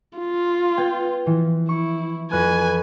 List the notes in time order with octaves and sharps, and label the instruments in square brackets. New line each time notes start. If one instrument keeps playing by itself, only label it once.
[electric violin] F4
[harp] B3 G5 G#6
E3 F3
[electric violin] E4 [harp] C#6
[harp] F2 F#6 [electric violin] B4 G#5